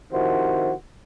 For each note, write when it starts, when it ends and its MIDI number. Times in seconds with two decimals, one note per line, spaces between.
0.12 0.73 48
0.12 0.73 51
0.12 0.73 53
0.12 0.73 64
0.12 0.73 66
0.12 0.73 72